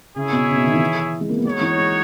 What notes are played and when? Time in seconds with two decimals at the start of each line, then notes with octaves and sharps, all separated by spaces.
0.16 C#3 E4 G#4 C#5 E5
0.32 B2
0.49 C#3
0.56 B2
0.64 D#3
0.73 E3
1.21 G#3
1.29 A#3
1.37 B3
1.45 G#3 D#4 F#4 C#5
1.61 E3
1.77 G#3